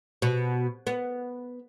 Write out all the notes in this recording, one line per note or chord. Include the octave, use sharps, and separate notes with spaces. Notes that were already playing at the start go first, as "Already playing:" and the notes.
B2
B3